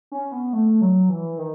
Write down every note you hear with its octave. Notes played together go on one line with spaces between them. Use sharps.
C#4
B3
A3
F#3
E3
D#3